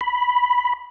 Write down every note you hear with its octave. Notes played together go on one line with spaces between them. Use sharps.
B5